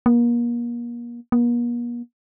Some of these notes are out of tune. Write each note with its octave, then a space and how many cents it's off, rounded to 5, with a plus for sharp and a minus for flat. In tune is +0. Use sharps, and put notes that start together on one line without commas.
A#3 +35
A#3 +45